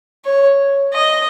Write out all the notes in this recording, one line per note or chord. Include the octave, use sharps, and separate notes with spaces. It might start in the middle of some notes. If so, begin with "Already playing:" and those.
C#5
D#5